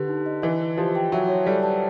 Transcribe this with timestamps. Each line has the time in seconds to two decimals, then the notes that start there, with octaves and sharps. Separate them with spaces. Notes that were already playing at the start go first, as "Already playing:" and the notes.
Already playing: D3 G4 B4
0.08 D#4
0.26 D#5
0.42 E3 D#5
0.61 B4
0.77 F3 G4
0.95 G5
1.12 F#3 E5
1.29 C#5
1.46 G3 A4
1.63 A5